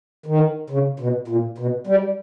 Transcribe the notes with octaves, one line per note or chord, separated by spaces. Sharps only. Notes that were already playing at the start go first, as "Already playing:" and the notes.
D#3
C#3
B2
A#2
B2
G3